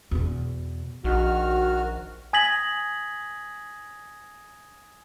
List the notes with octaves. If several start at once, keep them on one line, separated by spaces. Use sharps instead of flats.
E2 B2
A#1 D#3 F#4 F6
G#5 D#6 G#6 A#6 B6 F#7